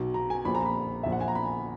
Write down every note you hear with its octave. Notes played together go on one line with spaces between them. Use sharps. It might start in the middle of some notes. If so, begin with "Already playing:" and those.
Already playing: B1 B2
A#5
G#5
A#1 A#2 B5
A#5
B5
A#1 A#2 E5
F#5
G#5
A#5
B5